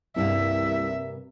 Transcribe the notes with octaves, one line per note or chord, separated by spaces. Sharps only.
C2 G2 C3 A#3 E5